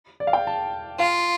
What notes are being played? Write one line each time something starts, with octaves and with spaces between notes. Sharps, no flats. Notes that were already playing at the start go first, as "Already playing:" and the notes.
D5
F5
G5
A5
F4 F5